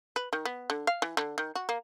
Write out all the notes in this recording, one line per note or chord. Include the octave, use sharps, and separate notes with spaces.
B4
D#3
B3
D3
F5
E3
D3
D#3
F#4
A#3